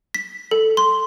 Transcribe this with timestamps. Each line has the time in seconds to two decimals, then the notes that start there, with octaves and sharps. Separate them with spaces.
0.14 B6
0.51 A4
0.77 C6